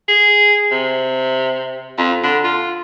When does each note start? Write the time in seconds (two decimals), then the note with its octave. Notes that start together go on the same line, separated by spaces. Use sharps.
0.08 G#4
0.71 C3
1.98 F2
2.23 D3
2.44 F4